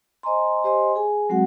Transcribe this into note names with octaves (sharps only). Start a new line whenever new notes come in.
C5 D#5 G#5 A#5 C6
G4 C5 D#5 G#5 C6
G#4 G#5
F#3 G#3 C4 F#4 F#5